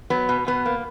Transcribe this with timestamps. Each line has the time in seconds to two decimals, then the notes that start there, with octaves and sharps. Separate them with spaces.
0.10 F#3 B3
0.29 B2
0.47 B2 B3
0.66 A#3